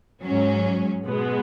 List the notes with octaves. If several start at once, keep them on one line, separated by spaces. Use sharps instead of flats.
G#2 F#3 C#4
B2 G#3 B3